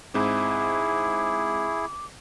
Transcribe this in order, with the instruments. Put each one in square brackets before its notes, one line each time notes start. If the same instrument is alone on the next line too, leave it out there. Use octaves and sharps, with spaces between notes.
[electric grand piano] G#2 C4 [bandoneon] E4 G#4 [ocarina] D6